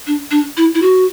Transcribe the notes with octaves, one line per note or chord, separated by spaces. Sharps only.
D4
D4
E4
E4
F#4